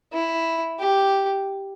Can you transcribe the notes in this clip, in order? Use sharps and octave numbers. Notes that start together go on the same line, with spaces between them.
E4
G4